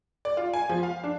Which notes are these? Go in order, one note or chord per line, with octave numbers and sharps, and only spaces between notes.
D5
F4
G#5
F3
F5
D4